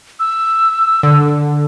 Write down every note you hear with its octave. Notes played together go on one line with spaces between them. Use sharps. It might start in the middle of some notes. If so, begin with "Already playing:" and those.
E6
D3